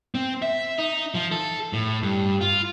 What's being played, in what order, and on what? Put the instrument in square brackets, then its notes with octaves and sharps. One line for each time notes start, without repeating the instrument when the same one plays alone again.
[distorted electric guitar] C4
E5
D#4
F3
A4
A2
G2
F4